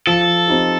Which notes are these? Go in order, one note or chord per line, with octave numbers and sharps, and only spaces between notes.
F3 A4
C4 D#4 G4